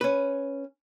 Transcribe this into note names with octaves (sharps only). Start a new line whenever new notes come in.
C#4 B4